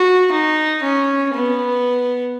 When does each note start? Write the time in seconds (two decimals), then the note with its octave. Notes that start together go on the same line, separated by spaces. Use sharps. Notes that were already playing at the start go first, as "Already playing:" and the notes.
Already playing: F#4
0.32 D#4
0.83 C#4
1.33 B3